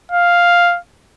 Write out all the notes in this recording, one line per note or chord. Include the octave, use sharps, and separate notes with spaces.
F5